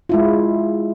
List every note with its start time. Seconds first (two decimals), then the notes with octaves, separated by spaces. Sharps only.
0.09 G#3 E4 F4